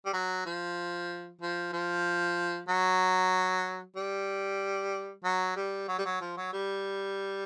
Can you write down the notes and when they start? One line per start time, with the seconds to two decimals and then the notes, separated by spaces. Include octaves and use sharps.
0.06 G3
0.13 F#3
0.46 F3
1.41 F3
1.73 F3
2.69 F#3
3.97 G3
5.24 F#3
5.56 G3
5.88 F#3
5.98 G3
6.05 F#3
6.21 F3
6.37 F#3
6.53 G3